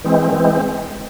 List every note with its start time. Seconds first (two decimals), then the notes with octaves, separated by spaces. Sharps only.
0.04 E3 G#3 C4
0.32 E3 G#3 C4